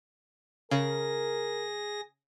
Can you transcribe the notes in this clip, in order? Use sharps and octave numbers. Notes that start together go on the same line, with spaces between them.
C#3 G#4 A#4 A#6